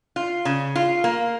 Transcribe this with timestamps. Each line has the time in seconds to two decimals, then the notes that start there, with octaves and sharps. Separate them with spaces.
0.16 F4
0.45 C#3
0.76 F4
1.04 A#3